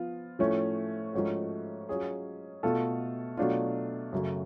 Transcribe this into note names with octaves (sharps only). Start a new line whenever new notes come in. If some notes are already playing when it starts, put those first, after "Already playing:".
Already playing: F3 B3 F4
A2 F3 A3 C#4
G#2 F3 A3 C#4 F#4
F#3 C#4 F4 G#4
B2 A3 F4 A4
B2 F#3 A3 D4 F4
F#2 C#3 F#3 A3